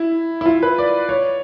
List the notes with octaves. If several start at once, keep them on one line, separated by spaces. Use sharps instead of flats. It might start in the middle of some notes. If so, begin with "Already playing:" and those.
Already playing: E4
E4
F4
B4
D5
C#5